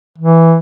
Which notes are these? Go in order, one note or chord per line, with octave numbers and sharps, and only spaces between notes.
E3